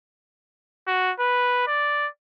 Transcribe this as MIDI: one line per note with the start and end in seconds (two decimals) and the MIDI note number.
0.87 1.12 66
1.20 1.63 71
1.68 2.08 74